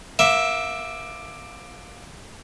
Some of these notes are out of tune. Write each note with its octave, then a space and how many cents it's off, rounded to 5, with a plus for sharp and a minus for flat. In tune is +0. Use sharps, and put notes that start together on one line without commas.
A#3 +25 E5 +0